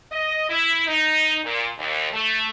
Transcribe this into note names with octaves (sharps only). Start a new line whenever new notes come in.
D#5
E4
D#4
A#2
D#2
A3